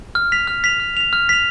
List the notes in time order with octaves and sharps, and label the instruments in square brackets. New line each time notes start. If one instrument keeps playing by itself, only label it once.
[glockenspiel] F6
B6 F7
F6
B6 F7
F6
B6 F7
F6
B6 F7